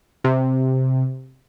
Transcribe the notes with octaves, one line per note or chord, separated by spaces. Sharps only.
C3